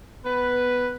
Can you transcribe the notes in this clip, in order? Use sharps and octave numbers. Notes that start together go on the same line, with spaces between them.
B3 B4